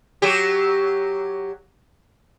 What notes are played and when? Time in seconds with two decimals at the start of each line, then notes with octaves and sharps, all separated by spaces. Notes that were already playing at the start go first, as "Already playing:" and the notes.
0.22 F#3 G4